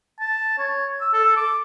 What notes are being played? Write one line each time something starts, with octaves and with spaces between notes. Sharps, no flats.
A5
C#5
E6
A4
D6